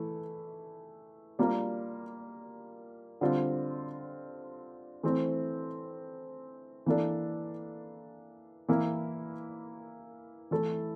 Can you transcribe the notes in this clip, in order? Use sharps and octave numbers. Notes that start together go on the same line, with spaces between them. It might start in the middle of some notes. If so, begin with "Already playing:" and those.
Already playing: E3 A3 E4
G3 A#3 D4 F4 A#4
D3 G3 C4 F4
E3 A3 C4
E3 A#3 D4 A4
E3 A#3 E4 A#4
E3 A3 E4 A4